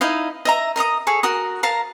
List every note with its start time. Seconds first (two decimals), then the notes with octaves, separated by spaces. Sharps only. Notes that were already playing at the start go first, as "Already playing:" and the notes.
0.01 D#4 E4 D#5 F5
0.45 D#5 E5 A#5
0.76 A#4 D#5 A#5 D#6
1.07 G#4 A4 C#5
1.23 F#4 A#4 D#6
1.63 A#4 F5 A5 A#5